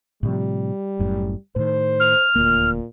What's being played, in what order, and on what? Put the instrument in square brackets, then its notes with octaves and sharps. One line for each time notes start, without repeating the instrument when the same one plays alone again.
[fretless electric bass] A2 C3 F3 [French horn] G3
[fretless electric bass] F#1 F#2 A2
[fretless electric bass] A2 D#3 [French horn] C5
[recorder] F6
[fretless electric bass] D#1 D2 A#3 [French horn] A#2